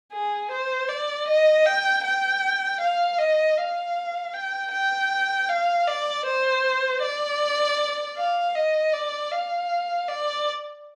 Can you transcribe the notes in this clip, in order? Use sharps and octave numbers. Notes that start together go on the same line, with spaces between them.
G#4
C5
D5
D#5
G5
G5
F5
D#5
F5
G5
G5
F5
D5
C5
D5
F5
D#5
D5
F5
D5